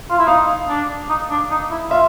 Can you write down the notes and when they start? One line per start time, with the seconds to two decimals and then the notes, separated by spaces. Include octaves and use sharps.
0.10 F4
0.19 E4
0.27 D#4 F5
0.68 D4
1.09 D#4
1.30 D4
1.50 D#4
1.70 E4
1.90 F4 E5